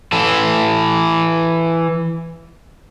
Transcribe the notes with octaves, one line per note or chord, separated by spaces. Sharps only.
E3 A4